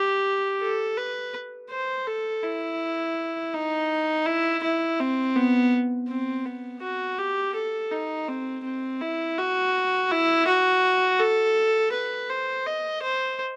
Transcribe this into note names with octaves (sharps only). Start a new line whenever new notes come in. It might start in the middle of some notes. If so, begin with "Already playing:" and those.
Already playing: G4
A4
B4
C5
A4
E4
D#4
E4
E4
C4
B3
C4
B3
F#4
G4
A4
D#4
C4
C4
E4
F#4
E4
F#4
A4
B4
C5
D#5
C5